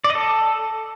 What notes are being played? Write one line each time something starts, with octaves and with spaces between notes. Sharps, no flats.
D5
D#5
A4